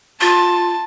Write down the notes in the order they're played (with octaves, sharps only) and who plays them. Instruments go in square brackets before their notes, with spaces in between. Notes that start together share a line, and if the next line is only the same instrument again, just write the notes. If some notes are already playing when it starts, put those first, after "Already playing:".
[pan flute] F4 [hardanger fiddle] A5